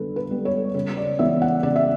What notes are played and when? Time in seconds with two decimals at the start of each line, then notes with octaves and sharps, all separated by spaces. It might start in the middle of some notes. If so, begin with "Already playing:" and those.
Already playing: D3 G3 B3 A4 B4
0.16 B4
0.31 G3 B3
0.45 C#5
0.75 C#3 C#5
0.97 D5
1.19 E3 B3 E5
1.42 F#5
1.63 C#3 D5
1.76 E5